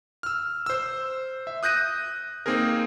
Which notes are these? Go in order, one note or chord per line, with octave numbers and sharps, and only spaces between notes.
E6 F6
C5 E6
E5
D#6 F#6 G6 A#6 D#7
A#3 C4 D#4 G#4 A#4